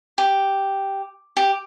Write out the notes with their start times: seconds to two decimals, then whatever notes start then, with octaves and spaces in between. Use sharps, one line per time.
0.18 G4
1.37 G4